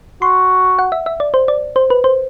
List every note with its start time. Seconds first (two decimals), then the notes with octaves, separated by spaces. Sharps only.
0.22 F#4 C6
0.79 F#5
0.92 E5
1.06 E5
1.20 D5
1.34 C5
1.48 D5
1.76 C5
1.90 B4
2.04 C5